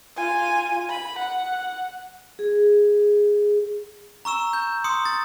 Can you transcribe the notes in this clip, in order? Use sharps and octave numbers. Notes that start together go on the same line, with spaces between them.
F4 G#5
B5
F#5
G#4
A#5 C#6 E6 E7
G6
C6 D#6 C#7
A6